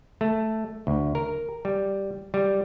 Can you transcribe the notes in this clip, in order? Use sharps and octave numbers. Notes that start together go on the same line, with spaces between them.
A3
D2
A#4
G3
G3